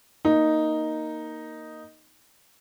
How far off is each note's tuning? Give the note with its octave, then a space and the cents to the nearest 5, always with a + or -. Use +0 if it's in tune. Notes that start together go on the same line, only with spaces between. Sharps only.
A#3 +0 D#4 +0